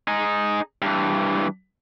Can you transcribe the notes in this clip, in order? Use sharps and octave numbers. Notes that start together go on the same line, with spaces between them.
D#4 G#4
G2 E3